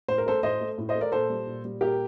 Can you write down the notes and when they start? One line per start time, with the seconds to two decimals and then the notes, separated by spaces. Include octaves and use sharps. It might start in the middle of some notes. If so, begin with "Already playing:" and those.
0.08 A2 C5
0.18 A#4
0.26 A3 A4 C5
0.43 A2 C5 D#5
0.61 A3
0.78 A2
0.89 C5 D#5
0.95 A3
1.01 A#4 D5
1.12 A#2 A4 C5
1.30 G3
1.47 A#2
1.64 G3
1.81 A#2 G4 A#4